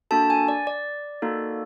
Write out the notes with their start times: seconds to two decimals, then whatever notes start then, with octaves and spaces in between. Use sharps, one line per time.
0.11 A#3 D4 F#4 A4 A5
0.30 G#5
0.48 D5
0.67 D5
1.22 A#3 D#4 F#4 A4